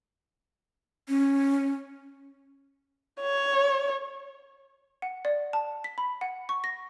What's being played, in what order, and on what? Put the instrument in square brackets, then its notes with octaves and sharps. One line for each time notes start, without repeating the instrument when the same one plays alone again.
[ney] C#4
[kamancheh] C#5
[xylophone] F#5
D5
A5
B6
B5
F#5
C#6
A#6